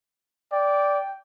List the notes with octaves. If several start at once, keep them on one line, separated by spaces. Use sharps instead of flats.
D5 G5